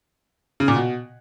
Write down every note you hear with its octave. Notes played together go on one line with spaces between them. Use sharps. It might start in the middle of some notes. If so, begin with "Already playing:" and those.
C#3
A#2
B2